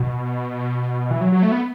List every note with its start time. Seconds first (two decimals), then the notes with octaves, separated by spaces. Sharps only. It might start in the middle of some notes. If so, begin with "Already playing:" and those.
Already playing: B2
1.11 E3
1.21 F#3
1.32 F#3
1.43 A3
1.52 B3